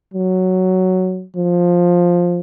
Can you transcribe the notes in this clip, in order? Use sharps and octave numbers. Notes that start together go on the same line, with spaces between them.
F#3
F3